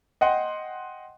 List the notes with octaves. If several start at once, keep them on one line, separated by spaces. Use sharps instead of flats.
D#5 F#5 G5 C6